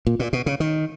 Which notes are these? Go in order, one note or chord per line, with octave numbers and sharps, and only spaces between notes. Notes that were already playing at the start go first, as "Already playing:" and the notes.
A#2
A#2
B2
C#3
D#3